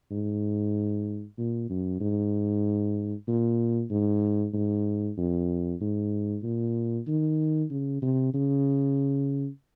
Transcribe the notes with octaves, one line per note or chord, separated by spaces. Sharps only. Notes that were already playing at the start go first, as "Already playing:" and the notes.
G#2
A#2
F#2
G#2
A#2
G#2
G#2
F2
G#2
A#2
D#3
C#3
C3
C#3